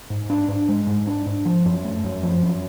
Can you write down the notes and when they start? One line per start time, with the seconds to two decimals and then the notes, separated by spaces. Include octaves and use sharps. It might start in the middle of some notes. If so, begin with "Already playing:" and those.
0.10 G#2
0.30 D4
0.48 G#2
0.69 G#3
0.87 G#2
1.07 D4
1.26 G#2
1.45 F3
1.66 F#2
1.84 A3
2.04 F#2
2.23 F3
2.43 F#2